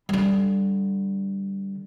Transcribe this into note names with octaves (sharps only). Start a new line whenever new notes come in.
D3 G3